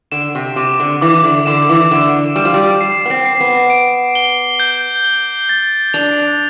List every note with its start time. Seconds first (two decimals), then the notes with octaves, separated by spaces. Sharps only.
0.12 D3 E7
0.35 C3
0.56 C3 D6
0.80 D3
1.01 E3 D6
1.23 D3
1.46 D3 E7
1.69 E3
1.91 D3 E7
2.36 G3 E7
2.45 F3
2.54 G3
2.81 C7
3.06 B3
3.10 C4
3.26 C7
3.40 B3
3.70 D7
4.15 G7
4.60 G6
5.04 G7
5.49 A6
5.94 D4 F7